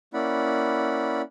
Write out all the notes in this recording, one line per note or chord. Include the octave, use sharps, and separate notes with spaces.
A#3 C#4 E4 D5 F#5 B5